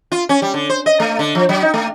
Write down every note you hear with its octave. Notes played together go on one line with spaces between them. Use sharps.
F4
C#4
G3
D3
C5
D#5
A3
D3
F3
F#3
D#4
A3